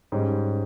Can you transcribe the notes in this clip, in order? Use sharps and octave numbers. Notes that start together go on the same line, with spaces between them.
G#2 G3 C#4